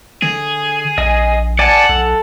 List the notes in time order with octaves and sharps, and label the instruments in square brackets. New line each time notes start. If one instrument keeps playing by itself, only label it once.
[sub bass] D3 [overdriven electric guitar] G#4
[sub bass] A#1 [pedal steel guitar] D#5 G#5
[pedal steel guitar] D5 G#5 A5 [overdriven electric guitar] F#5
[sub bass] B1 [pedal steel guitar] A4